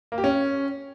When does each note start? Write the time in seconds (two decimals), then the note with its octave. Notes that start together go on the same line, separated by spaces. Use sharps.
0.12 A#3
0.18 G4
0.24 C#4